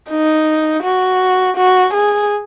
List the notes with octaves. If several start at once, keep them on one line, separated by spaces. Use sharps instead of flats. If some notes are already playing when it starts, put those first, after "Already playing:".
D#4
F#4
F#4
G#4